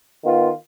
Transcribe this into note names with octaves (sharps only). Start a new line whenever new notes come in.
D#3 B3 F4